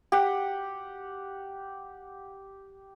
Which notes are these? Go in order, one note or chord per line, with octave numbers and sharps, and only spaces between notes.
G4 F#5